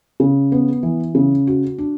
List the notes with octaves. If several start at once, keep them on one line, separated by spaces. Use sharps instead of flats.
C#3
B3
E3
C#3
F#4
D4